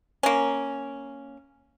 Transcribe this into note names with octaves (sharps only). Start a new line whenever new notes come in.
A#3 C#4